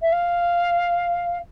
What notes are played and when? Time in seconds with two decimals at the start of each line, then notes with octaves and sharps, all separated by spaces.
0.02 E5
0.12 F5